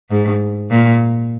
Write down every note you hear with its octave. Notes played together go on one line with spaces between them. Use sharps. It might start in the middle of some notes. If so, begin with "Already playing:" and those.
G#2
A#2